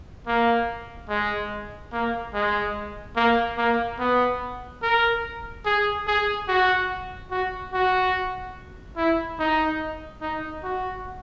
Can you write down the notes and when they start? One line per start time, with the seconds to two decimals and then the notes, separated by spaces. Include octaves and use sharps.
0.27 A#3
1.09 G#3
1.93 A#3
2.34 G#3
3.16 A#3
3.58 A#3
3.99 B3
4.82 A#4
5.66 G#4
6.07 G#4
6.48 F#4
7.31 F#4
7.73 F#4
8.97 E4
9.39 D#4
10.21 D#4
10.64 F#4